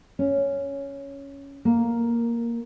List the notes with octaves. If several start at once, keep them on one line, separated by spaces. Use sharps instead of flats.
C#4
A#3